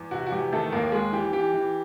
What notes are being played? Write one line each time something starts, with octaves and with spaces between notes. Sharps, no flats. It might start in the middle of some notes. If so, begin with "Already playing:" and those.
Already playing: E2
C3 F#4
F#4
E2 G4
D#3 A3 A4
D#2 A#3 A#4
D#2 G#3 G#4
E3 G4
E3 G4
E3